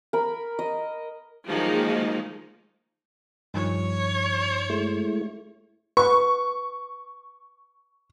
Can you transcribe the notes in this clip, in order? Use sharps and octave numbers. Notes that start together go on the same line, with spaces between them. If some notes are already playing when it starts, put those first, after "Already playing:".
A#4 B5
D#5
D#3 F3 F#3 G#3 A#3 D#4
G2 D#3 F3 C#5
G#3 A3 E4
B4 C#6